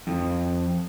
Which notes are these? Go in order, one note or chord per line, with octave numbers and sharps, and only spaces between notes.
F2